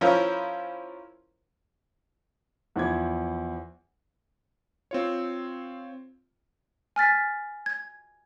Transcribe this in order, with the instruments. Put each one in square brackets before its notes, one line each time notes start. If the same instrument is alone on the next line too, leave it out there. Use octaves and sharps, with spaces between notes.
[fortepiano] F3 C#4 E4 F4 A#4 C5
[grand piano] E2 F3 E4 C5 D6 G#6
[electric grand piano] C4 F4 C#5
[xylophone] G#5 F6 A6 B6
G#6